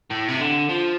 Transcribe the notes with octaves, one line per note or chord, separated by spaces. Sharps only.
A2
C3
D3
F3